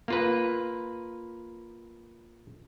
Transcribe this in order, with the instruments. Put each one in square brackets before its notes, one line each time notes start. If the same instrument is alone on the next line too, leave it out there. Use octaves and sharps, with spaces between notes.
[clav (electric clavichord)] A#3 F4 B4